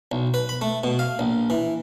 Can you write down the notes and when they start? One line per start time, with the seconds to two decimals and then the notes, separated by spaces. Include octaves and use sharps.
0.12 B1
0.34 B4
0.49 B5
0.61 A3
0.84 B2
0.99 F5
1.19 A#1
1.50 E3